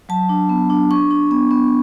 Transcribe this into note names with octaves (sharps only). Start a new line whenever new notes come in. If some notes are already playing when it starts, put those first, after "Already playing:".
F#3 A5
D4
B3
D4
D4 C#6
D4
B3
B3